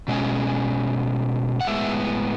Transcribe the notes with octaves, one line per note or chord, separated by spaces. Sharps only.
B2 G#3 C#4
F#5
A2 G#3 B3 E5